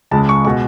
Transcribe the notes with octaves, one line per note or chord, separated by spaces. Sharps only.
C#2 C#3 G#3 A5
C#6
B2 G#3 C#6